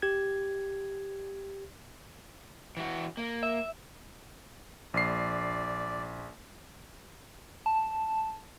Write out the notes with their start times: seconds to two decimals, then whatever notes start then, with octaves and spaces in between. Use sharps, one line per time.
0.02 G4 G#6
2.77 E3 F#4
3.17 A#3
3.43 E5
4.94 A#1 D5 C7
7.66 A5